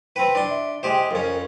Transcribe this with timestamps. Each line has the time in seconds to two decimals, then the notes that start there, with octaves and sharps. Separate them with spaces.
0.16 C4 B4 G5
0.35 D4 C6
0.50 E5
0.83 G#3 G4 C5 G5
1.11 F2 C#4 A#4